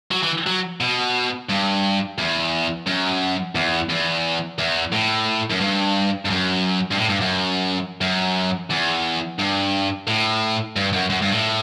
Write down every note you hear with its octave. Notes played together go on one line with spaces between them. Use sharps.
F#3
E3
F#3
B2
G2
E2
F#2
E2
E2
E2
A2
F#2
G2
G2
F#2
G2
A2
G2
F#2
F#2
E2
G2
A2
G2
F#2
F#2
G2
A2